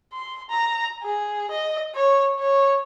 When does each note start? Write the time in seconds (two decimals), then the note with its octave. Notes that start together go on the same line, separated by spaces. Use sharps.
0.13 C6
0.50 A#5
1.03 G#4
1.50 D#5
1.95 C#5
2.39 C#5